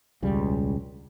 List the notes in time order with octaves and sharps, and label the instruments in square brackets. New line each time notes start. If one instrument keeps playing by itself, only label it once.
[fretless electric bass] E1 C#2 C#3 G3